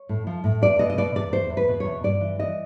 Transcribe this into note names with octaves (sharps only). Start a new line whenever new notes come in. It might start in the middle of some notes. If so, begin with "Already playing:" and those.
Already playing: C#5
A2
F3
A2
E2 D5
B2 D#5
D#5
B2 D5
E2 D5
E2 C5
E2
B4
B2
C#5
E2
G2 D5
E3
E3 D#5